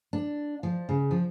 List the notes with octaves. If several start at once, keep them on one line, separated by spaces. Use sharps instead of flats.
D4
F3
C#3
F3